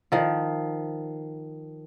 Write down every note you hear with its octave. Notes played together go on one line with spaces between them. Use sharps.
D#3 F3